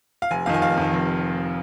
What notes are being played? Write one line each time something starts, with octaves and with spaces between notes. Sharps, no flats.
F5
F1 G#5
F2 D#3 F5
G#5
F1 F5
F2 D#3
F1